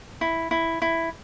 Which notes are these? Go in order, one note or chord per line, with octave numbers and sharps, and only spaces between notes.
E4
E4
E4